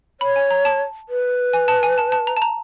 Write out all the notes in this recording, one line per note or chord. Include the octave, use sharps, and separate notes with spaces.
C#5 B5
G#5
A#5
A5
B4
G#5
A5
G#5
A5
A5
A#5
A5
A#5